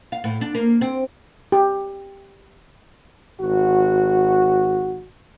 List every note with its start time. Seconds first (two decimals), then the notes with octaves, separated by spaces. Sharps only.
0.12 F5
0.24 A2
0.41 D4
0.55 A#3
0.81 C4
1.52 G4
3.40 G#1 F#4